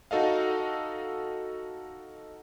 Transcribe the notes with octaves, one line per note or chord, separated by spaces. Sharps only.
D#4 F#4 A4 D#5 F5